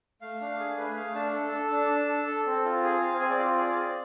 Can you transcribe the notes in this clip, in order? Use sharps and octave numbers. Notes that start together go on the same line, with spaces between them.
A3 F5
D4
G#4
A3 B4
A3 F5
D4 A5
A4
A4
D4
D4
A4
A4
C4
F4
G#4
C4 F5
G#5
C4
D5
F4
G#4 D5
C4